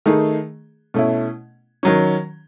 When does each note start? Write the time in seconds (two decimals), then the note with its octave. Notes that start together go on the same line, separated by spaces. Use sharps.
0.06 D#3 A3 D#4 G#4
0.94 B2 A3 C#4 E4
1.83 D#3 F#3 C#4